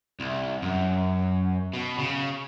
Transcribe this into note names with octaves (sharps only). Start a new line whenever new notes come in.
C2
F#2
B2
C#3